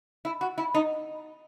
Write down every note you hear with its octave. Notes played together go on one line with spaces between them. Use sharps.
E4
F#4
E4
D#4